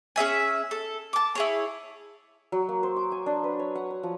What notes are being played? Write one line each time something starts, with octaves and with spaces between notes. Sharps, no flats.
C#4 G#4 E5 G#5
A4
A5 D6
E4 G#4 C#5
F#3
A#3
C5
D6
G#5
D4
B4
C#5
F#5
B4
F3